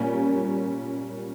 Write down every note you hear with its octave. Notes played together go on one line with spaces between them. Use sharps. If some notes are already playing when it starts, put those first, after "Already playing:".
Already playing: A#2 G3 A#3 C#4